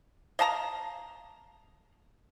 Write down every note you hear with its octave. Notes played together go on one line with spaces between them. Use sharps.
D#5 F5 A5 A#5